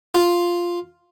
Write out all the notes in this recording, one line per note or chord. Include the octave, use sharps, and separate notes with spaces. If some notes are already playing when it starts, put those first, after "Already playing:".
F4